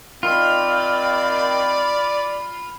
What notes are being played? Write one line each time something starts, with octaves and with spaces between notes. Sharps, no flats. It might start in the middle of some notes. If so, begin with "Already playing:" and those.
D#3 C4 F4 D5 B5